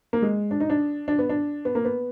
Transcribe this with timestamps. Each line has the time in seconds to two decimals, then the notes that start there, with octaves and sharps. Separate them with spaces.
0.13 A#3
0.22 G#3
0.51 D4
0.60 D#4
0.70 D4
1.08 D4
1.19 B3
1.29 D4
1.65 B3
1.75 A#3
1.85 B3